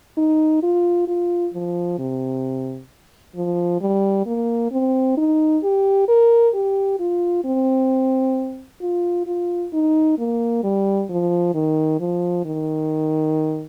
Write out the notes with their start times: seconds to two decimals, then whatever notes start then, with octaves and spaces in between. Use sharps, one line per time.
0.17 D#4
0.63 F4
1.08 F4
1.54 F3
1.99 C3
3.36 F3
3.81 G3
4.26 A#3
4.72 C4
5.17 D#4
5.63 G4
6.08 A#4
6.55 G4
6.99 F4
7.45 C4
8.81 F4
9.27 F4
9.73 D#4
10.18 A#3
10.63 G3
11.09 F3
11.54 D#3
12.00 F3
12.45 D#3